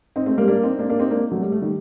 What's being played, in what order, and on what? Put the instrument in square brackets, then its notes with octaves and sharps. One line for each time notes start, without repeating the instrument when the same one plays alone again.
[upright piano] C4 D#4
A3 C4
G3 A#3
A#3 D4
C4 D#4
A#3 D4
A#3 D4
C4 D#4
A#3 D4
F#3 A3
G3
A3
D#3 G3